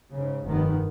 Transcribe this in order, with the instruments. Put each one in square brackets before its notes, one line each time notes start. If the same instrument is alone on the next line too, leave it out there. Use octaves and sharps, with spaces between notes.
[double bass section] G#2 C#3
F1 G2 D#3 B3